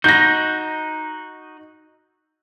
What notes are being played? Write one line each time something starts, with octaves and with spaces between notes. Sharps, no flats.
D#4 F#4 G6 A#6